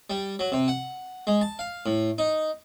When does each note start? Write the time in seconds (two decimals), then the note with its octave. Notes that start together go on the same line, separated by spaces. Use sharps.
0.10 G3
0.39 F#3
0.52 C3
0.68 F#5
1.27 G#3
1.41 A5
1.59 F5
1.86 A2
2.18 D#4